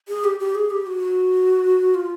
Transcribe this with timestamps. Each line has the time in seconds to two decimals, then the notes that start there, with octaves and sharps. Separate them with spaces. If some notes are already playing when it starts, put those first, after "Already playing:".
0.08 G#4
0.24 G4
0.40 G4
0.55 G#4
0.70 G4
0.86 F#4
1.94 F4